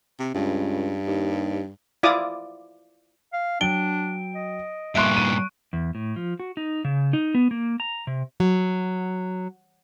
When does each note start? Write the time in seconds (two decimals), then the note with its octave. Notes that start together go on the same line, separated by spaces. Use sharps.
0.19 C3
0.34 C#2 G2
1.07 D#2
2.03 E4 F4 D5 D6 D#6
3.33 F5
3.61 F#3 D4 G5 D7 G7
4.35 D#5
4.95 G2 A#2 E5 C6 C#6 F#6 D7
5.17 D#7
5.73 E2
5.95 A2
6.16 F3
6.40 F#4
6.57 D#4
6.85 C#3
7.13 D#4
7.35 B3
7.51 A#3
7.80 A#5
8.07 C3
8.40 F#3